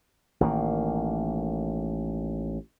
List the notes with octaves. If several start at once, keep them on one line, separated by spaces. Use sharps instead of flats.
A1 D#3 A#3